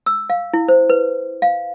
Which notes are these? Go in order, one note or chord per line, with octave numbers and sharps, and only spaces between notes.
E6
F5
E4
C5
B4
F5